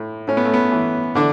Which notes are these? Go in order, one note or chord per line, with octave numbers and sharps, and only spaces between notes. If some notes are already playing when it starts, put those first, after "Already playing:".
Already playing: A2
A2 C#4
B3
A3
B3
E3
D3 E3 D4